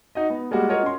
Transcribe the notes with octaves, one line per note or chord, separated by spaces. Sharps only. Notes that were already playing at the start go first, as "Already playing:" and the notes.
D#4 F#4 D#5
B3
G3 G#3 A#3 F#4
F4 F#4 A#4 C#5 D#5
C#4 C6